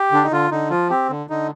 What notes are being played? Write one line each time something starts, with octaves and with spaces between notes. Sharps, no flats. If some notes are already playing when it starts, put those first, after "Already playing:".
Already playing: G4
D3 D4
D#4
D3 F4
D3 D#4
F3 F4
C4 G4
D3
D3 D#4